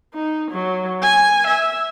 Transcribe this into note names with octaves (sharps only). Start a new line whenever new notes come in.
D#4
F#3
G#5
E5